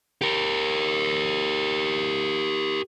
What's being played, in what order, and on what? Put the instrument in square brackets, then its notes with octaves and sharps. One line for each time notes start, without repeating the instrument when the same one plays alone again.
[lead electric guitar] G4 A#4